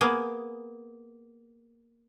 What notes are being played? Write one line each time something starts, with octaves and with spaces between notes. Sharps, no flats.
A#3 B3 G#4